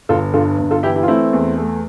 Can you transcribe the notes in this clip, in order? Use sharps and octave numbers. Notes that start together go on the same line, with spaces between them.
G1 F4 A4
G2 F4 A4
G1
F4 A4
E3 E4 G4
E4 G4
F4
A3 C4 E4
E2
A3